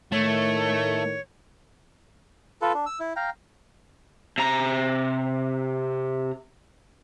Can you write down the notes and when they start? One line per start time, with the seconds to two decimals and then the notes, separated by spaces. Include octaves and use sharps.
0.12 A2 D#3 A3 C#5
2.62 F4 A4 B4
2.74 D4
2.86 E6
3.00 E4
3.16 F5 G5 A#5
4.38 C3 A#5